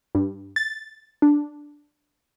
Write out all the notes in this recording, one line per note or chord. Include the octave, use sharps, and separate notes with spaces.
G2
A6
D4